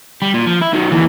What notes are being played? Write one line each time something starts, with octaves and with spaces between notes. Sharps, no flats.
G3
A#2
F3
E4
D#3 F#3
D#2 E3